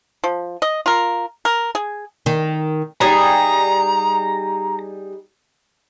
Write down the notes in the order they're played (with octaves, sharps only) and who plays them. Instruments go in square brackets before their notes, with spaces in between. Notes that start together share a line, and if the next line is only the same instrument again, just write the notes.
[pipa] F3
D#5
F4 A#4
A#4
G#4
[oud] D#3
[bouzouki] G3 D#4 G#4 [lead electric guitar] A#5